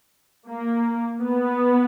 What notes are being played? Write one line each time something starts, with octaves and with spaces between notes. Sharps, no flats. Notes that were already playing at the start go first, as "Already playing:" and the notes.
A#3
B3